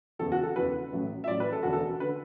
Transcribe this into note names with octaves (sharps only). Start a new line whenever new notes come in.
F#1 E2 E3 A4
F#4
A4
F#1 E2 E3 B4
A1 A2 F#3
E5
A1 A2 F#3 D5
B4
A4
E1 D2 D3 F#4
A4
D3 B4